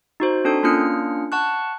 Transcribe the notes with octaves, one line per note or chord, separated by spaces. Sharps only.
D#4 F#4 C5
C4 D4 A4 G6
A#3 C#4 D4 F4 F6 C#7
F#5 A5 C#6 F#6